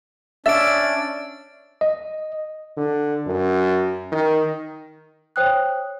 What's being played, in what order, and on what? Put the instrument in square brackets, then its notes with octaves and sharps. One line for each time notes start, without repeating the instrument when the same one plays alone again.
[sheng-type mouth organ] C#4 D4 [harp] E5 [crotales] A6 D7
[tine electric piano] D#5
[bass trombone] D3
F#2
D#3
[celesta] C5 C#5 G5 D#6 F#6